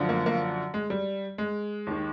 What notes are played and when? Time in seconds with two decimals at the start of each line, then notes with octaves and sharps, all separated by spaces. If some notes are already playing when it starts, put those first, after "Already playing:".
Already playing: F#2 D3 F3
0.09 A#3
0.26 A#3
0.74 G#3
0.90 G3
1.38 G#3
1.87 D#2 D#3